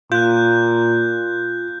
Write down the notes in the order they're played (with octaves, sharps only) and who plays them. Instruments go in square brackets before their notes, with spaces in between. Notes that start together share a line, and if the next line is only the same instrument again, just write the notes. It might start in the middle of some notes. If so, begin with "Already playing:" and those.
[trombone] A#2 [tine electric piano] F4 [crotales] F#6 G6